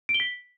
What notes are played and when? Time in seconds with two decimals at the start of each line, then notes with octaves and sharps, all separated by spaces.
0.09 D7
0.14 G7
0.20 B6